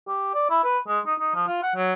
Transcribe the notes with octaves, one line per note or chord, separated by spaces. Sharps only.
G4
D5
E4
B4
G#3
D#4
D#4
F3
F4
F#5
F#3